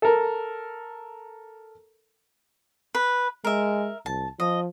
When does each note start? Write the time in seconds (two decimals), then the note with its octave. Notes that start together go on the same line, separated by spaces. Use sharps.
0.02 A4 A#4
2.95 B4
3.44 G#3 A#4 E5
4.06 C2 A5
4.40 F3 D#5